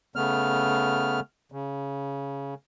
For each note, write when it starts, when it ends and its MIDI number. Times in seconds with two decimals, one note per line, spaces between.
0.16 1.20 49
0.16 1.20 57
0.16 1.20 59
0.16 1.20 89
1.52 2.54 49